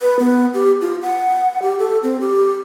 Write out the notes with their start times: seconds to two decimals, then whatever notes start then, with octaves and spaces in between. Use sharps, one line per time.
0.02 B4
0.19 B3
0.54 G4
0.81 F4
1.02 F#5
1.62 G4
1.79 A4
2.03 C4
2.21 G4